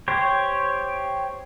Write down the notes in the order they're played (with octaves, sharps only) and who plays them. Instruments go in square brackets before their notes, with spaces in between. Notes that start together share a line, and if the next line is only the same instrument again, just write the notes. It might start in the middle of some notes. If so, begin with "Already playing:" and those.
[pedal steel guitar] G4 C5 C#5